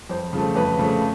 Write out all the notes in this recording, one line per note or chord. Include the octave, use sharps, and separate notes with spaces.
F2 C5
C#3 F3 A3
F2 B4
C#3 F3 A3